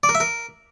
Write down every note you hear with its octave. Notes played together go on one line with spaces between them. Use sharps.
D5
A#4
E5
A#4